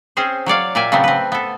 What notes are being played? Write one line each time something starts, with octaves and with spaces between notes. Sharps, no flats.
C4 C#4 G#4 C5
F#3 C#5 D5 F5
A#2 D5 E5 G5 G#5
C#3 F#3 A3 B3 C4
C4 B4
B3 A4